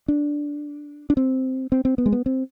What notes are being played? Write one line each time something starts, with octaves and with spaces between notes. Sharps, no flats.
D4
D4
C4
C4
C4
B3
G#3
B3
C4